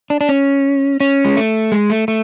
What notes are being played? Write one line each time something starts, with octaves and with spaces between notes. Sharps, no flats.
D4
D4
C#4
C#4
G#3
A3
G#3
A3
A3